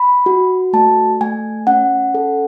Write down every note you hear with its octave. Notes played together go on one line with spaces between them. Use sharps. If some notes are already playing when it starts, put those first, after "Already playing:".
Already playing: B5
F#4
A3 A5
A3 G#5
C#4 F#5
A4